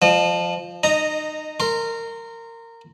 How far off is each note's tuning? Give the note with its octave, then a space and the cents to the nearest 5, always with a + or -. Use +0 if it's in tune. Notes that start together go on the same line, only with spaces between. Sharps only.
F3 +0 D#5 -35
D#4 -25 D#5 +0 A#5 -10
A#4 -20 C6 +0